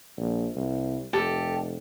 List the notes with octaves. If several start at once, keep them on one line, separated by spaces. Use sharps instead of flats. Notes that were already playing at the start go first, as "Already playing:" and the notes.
A#1
C2
F1 G4 A4